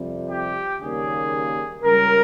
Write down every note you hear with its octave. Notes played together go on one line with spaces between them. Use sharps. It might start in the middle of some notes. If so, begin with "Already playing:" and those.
Already playing: F2 C3 G3
G4
D#2 C#3 G3 A#3 G#4
C#2 C#3 G3 A#4